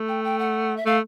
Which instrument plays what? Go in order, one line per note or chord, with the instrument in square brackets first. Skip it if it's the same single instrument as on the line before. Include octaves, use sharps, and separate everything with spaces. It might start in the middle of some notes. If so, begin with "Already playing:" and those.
Already playing: [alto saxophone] A3
[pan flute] G5
G5
F#5
E5
[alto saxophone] A3 [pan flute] F5